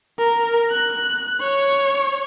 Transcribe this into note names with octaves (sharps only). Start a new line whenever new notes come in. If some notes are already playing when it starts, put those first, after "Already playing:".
A#4
F#6
C#5